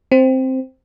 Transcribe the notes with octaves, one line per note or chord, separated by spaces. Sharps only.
C4